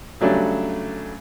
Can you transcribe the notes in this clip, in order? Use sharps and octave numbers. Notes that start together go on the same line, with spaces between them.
C#3 F#3 G3 A3 D4